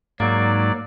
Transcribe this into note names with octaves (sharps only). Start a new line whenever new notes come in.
G#2 F#3 A#3 D5